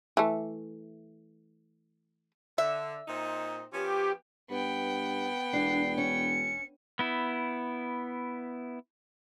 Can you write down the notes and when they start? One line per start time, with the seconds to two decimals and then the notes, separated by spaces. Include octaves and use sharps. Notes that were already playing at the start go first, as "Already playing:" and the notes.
0.17 E3 A3
2.58 D3 E5
3.08 A#2 C4 D#4
3.74 F3 B3 C#4 G4
4.50 G2 B3 G5
5.53 E1 D4 C7
5.98 C#4 C#7
6.99 B3 E4